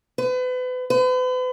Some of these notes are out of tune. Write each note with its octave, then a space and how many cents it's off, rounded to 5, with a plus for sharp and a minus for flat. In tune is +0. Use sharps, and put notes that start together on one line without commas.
B4 +35
B4 +40